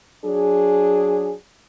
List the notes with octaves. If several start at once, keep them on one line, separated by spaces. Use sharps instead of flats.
F#3 D4 G#4